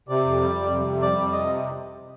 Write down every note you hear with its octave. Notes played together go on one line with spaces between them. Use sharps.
C3 D5
F2
G3
F2
C3
F2
G3 D5
F2
C3 D#5